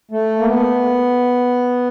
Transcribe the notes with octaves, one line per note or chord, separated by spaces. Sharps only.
A3
A#3
B3